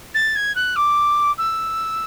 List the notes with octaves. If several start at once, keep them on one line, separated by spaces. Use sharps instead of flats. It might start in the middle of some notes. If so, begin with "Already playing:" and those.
A6
G#6
F#6
D6
E6